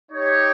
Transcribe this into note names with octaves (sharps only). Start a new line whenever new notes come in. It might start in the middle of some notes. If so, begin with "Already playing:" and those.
D#4 G4 C#5